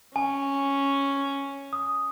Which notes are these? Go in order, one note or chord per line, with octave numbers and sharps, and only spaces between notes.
C#4 G#5
D#6